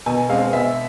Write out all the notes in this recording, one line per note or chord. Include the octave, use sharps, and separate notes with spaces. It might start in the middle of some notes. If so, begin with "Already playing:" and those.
B2 G#5
G#3 C4 F5
B2 E5